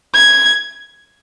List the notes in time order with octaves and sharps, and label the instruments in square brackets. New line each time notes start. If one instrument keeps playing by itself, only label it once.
[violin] G#6